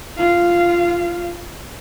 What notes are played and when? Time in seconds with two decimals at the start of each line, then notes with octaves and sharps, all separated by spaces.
0.17 F4 F5